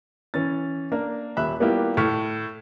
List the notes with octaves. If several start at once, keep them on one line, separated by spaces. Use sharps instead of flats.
E3 C#4 A6
A#3 D4 A#4
D#1 E5 B5 F#6
G3 A#3 B3 E4 F4 G4
A2 C#6 F6 B6